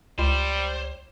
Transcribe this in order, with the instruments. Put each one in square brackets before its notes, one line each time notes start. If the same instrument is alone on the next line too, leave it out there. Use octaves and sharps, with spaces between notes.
[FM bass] C#2 [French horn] G3 [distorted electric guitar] C5